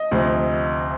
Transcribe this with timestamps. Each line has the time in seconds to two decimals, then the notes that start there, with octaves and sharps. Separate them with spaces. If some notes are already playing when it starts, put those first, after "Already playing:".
Already playing: D#5
0.11 D2 C3 F3